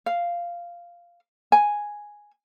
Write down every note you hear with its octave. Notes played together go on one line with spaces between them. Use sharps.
F5
G#5